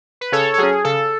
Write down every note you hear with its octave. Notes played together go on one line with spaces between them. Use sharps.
B4
C#3 A4 C#5
A4
F#3 C#4 G#4
C#3 A4